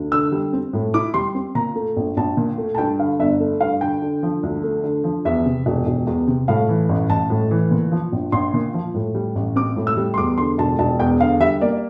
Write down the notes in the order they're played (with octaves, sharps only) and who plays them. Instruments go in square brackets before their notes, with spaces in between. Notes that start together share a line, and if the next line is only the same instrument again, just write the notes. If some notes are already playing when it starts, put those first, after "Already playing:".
Already playing: [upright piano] D2
D3 E6
G3
C4
A2
E4 D6
G3 C6
C4
A#2 A#5
A3
A#1
A#1 A5
A#2
A3
A5
G2 G5
D3 F5
G1 E5
A3
G2 F5
D3 G5
D3
F3
D2
A3
D3
F3
E2 E5
C3
E1
E1
E2
C3
A2 F5
E3
A1
A1 A5
A2
E3
A#2
F3
A#1
A#1 C6
A#2
F3
A2
G3
A1
C4 D6
A2
E6
G3
C6
E2 D6
D3 C6
E1 A5
E1 A5
E2 G5
D3 F5
G3 E5
A#3 D5